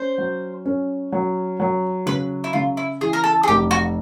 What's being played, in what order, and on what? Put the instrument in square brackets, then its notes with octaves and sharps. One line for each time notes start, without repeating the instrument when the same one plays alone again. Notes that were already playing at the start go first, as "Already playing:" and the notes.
Already playing: [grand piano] C#4 [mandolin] C5
[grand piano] F#3
C#4
F#3
F#3
[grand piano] C#3 [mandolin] B4
[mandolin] E4
[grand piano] C#3 [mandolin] F4
[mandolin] E4
[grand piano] E3 [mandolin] G#4
[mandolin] A#4
A4
G#4
[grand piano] F1 [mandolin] G4
[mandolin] F#4